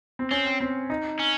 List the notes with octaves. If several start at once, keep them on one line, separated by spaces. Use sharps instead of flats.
C4
C4 C#4
C4
D#4
C#4